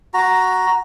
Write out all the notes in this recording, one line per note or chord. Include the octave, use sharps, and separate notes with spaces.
F#4 A#5